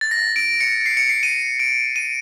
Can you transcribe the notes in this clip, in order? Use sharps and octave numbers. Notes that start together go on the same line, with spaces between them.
A6
A#6
D7
C#7
C7
C#7
C7
D#7
D7
D#7